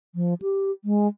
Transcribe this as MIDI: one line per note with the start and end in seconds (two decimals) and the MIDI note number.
0.15 0.34 53
0.42 0.71 67
0.84 1.08 56